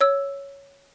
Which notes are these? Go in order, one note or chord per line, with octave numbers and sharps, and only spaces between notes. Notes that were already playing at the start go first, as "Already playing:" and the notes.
C#5 E6